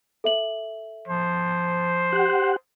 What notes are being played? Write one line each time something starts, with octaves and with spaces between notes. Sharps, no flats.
A4 E5 F#7
F3 C5
G4 F#5